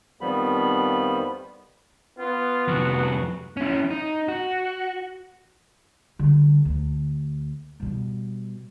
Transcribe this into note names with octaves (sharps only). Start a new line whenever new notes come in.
F2 D#3 F3 G3 B3 B5
B3 F4
C2 F2 F#4
C#4 E4
D#4
F#4
D3 G3
D2
B2 G3